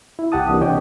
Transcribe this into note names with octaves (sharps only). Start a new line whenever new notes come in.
E4
C2 G4 F#5 A5 D#6
E3 A#3 D4
C3 G4 C#5 D#5 G5